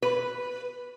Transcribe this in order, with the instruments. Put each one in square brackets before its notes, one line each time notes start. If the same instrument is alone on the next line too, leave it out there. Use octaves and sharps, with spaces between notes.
[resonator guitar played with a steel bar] B4